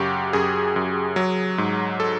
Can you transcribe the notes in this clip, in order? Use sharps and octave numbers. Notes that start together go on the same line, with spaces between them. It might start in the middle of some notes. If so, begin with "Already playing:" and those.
Already playing: F#2 C#3 F#4 G4
F#2 G#4
F#2
F#3
G#2
A4